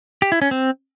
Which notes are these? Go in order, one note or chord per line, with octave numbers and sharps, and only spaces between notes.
G4
E4
C#4
C4